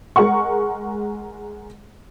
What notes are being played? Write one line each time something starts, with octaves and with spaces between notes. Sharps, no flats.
G#3 A#4 F#5 C#6